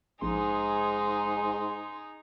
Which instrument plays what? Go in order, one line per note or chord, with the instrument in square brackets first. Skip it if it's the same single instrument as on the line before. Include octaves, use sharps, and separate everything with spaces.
[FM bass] A#1 [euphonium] G#2 [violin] D#4 G#4 [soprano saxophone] C6